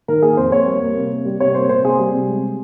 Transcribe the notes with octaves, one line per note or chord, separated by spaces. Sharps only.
D#3 A#4
A#3 G#4
F2 C5
A#3 C#5
G3
A#3
C3
A#3
G3
C3 C#5
A#3 C5
C3 C5
A#3 G#4
G3
C3
G#3